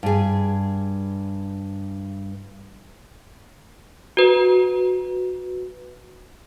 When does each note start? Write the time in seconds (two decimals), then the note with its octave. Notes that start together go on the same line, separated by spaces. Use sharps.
0.03 G2 G#4
4.17 F#4 B4